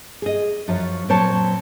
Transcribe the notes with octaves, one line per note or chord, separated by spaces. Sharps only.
G#4 D#5
F#2 F3 F#3
A#2 F#3 C4 C5 C#5 A5